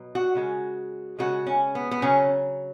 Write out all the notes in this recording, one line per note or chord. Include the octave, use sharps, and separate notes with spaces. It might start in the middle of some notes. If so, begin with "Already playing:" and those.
Already playing: B2 F#3
F#4
C#3 G#3
C#3 G#3 F#4
C#4
B3
B3
C#3 F#3 C#4